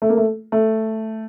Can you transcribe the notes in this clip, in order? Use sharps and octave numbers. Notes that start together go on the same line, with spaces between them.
A3
A#3
A3
A3